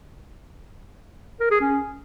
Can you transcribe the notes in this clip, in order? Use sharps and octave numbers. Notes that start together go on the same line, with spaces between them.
A#4
G#4
C#4